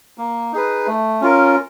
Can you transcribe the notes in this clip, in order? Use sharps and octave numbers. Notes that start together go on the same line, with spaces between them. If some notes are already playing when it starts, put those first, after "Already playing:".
A#3
D#4 G#4 B4
A3
C#4 F4 A#4